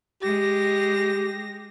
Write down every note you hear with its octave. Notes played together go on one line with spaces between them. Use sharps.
G#3 G4 A#6